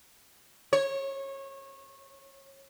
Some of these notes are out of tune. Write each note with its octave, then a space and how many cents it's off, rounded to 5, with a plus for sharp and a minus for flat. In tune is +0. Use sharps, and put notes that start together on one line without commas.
C#5 -25